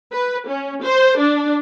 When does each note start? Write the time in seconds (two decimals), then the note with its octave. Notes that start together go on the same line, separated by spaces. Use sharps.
0.12 B4
0.48 C#4
0.83 C5
1.18 D4